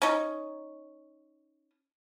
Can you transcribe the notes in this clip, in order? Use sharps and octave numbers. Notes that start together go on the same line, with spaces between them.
C#4 D#4